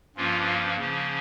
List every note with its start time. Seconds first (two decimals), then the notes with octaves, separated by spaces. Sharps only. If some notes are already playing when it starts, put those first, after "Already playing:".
0.16 G2 F3 A#3 C#4 F4
0.78 C#3 F3 A#3 C#4